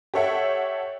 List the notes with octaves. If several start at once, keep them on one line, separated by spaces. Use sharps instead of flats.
G4 A4 C#5 E5 F#5 G5